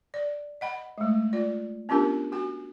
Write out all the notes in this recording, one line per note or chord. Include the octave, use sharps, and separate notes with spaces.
D5
D#5 F#5 B5
G#3 A3
F4 D5
B3 C#4 D4 F4 G4 A#4
F#4 G#5